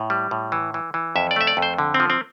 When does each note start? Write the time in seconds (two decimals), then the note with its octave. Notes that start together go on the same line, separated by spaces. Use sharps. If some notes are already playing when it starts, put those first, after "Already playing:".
Already playing: A2
0.10 G3
0.31 A2
0.52 E3
0.74 E3
0.94 E3
1.16 F2 E5
1.31 D5
1.36 A3 E5
1.47 D5
1.57 F2
1.62 C5
1.78 D3
1.94 C4
2.00 F3
2.10 C4